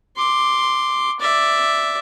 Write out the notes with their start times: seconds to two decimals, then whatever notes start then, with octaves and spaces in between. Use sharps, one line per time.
0.16 C6 D6
1.20 D5 E5